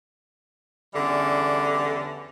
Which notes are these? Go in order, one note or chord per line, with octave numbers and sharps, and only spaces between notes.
E2 D3 E3 G3 C#4